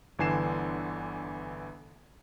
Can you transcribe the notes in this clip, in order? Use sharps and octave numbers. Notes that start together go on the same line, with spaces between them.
G1 D3 E3 G#5 C7 E7